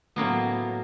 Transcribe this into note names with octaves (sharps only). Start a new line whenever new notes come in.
A2 F#3 A#3 B3